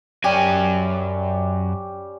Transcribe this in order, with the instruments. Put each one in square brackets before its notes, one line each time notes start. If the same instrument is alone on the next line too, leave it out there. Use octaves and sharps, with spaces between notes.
[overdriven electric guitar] F#2 G#5 [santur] G3 C#4 G4